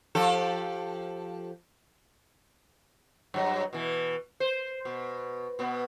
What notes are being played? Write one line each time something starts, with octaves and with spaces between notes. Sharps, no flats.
F3 G4 A4
G2 F#3 D#5
B2 E3
C5
B2
B2 B3